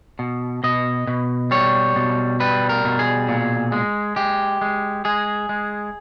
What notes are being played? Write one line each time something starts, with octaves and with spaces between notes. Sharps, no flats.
B2
B2 D#5
B2
G3 C#5
B2
G3 B4
A#4
B2
G#4
A#2
G#3
G#3 G4
G#3
G#3 G#4
G#3